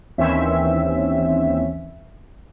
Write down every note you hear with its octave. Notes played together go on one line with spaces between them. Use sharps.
D#2 E3 C4 C#4 E5